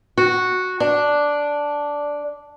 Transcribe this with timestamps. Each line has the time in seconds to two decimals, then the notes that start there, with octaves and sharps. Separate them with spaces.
0.18 F#4
0.80 D4